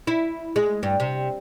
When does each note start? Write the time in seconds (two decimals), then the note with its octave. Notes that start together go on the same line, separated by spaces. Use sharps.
0.07 E4
0.56 G#3
0.83 G2
1.00 C3